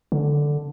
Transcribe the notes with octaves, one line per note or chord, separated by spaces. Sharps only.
D3